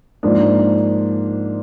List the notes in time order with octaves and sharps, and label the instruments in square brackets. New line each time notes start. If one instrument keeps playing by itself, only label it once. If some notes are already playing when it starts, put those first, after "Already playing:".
[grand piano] G#2 F3 A#3 D4